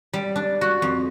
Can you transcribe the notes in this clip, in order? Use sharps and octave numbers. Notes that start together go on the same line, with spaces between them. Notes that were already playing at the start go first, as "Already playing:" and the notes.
G3
D4
F#4
F2